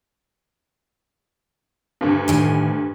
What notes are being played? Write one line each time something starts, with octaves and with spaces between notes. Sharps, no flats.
D2 G2
A2 D#3 G#5